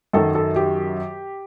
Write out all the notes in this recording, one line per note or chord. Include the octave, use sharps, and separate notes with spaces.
F#2 D#3 F#3 A4
A4
G4